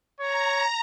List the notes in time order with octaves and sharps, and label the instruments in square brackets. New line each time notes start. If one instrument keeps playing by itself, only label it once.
[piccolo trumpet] C#5 [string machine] A#5